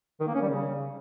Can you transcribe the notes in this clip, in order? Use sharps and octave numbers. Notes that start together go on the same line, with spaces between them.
D#3
A#3
C#4
G3
C#3